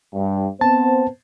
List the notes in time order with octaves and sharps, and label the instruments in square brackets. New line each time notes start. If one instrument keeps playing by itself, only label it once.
[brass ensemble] G2
[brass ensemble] B3 C4 C5 [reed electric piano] A5